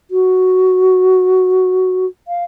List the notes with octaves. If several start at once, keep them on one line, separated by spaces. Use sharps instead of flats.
F#4
F5